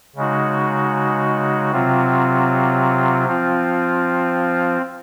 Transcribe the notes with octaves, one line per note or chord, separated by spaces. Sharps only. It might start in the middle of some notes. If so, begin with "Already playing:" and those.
C#3 G#3 D#4 F#4
C3 F#3 C4 F4
F3 C4 F4